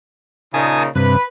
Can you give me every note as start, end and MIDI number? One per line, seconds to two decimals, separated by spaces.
0.54 0.88 46
0.54 0.88 49
0.54 0.88 63
0.54 0.83 80
0.54 0.83 81
0.54 0.83 87
0.95 1.17 43
0.95 1.17 48
0.95 1.26 71